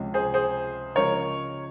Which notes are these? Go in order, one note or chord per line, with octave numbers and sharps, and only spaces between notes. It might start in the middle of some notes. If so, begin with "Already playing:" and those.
Already playing: C#2 C3 F3 G#3 C#4
G#4 C5
G#4 C5
C#3 F3 G#3 A#4 C#5